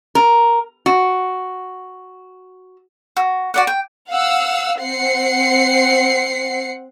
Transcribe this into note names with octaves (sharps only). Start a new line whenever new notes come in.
A#4
F#4
F#4
F#4 D5 F#5
G5
F5 F#5 E6
C4 F#5 C7 C#7